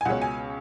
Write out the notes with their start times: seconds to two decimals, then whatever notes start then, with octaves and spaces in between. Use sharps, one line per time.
0.01 G#5
0.05 C#2 B2 G#3 C#4 F#5
0.22 G#5